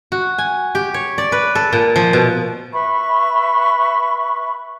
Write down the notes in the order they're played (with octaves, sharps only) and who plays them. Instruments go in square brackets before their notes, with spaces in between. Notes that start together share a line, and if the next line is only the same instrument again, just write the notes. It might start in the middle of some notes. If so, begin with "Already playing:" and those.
[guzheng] F#4
G#5
G4
C#5
D5
B4
A4
A#2
F3
B2
[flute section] B4 E5 B5 C#6